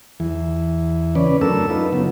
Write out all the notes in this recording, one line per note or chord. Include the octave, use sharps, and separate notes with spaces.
E2 E3
C#3 C#4 B4 D5
F#2 A3 D4 A4 A#4 E6
D#4 F4 B4
C#3 F#3 B3